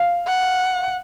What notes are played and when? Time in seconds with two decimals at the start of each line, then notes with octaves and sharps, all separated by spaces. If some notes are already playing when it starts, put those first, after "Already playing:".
Already playing: F5
0.27 F#5